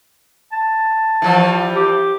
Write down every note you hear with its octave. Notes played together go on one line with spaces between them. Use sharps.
A5
E3 F3 G3
G4